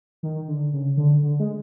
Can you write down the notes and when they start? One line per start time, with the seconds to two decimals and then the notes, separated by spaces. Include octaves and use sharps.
0.23 D#3
0.48 D3
0.73 C#3
0.97 D3
1.23 D3
1.40 G#3